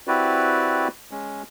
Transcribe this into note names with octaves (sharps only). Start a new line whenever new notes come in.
C4 E4 F#4 G4 B4 D5
G#3 C#4